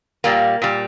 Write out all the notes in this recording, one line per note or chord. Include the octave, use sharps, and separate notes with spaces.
A#2 G3 A#3
A#2 G3